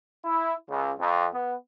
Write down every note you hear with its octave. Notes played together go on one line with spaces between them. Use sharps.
E4
C#2
F2
B3